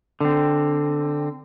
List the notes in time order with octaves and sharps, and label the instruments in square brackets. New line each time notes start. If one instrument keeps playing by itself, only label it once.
[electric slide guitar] D3 C4